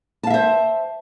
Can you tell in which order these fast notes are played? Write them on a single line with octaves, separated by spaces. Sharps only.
A5 F5 E5 C5